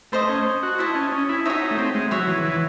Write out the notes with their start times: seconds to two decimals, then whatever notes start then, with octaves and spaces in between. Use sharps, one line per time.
0.12 A3 C5 D#5 A5
0.29 C#4
0.63 F#4
0.78 E4 C5 D#5 A5
0.95 C#4
1.12 C#4
1.29 E4
1.45 D#4 F#4 C#5 E5
1.61 D#4
1.71 A3
1.78 C4
1.95 G#3
2.11 F#3 F#4 C#5 E5
2.27 E3
2.45 E3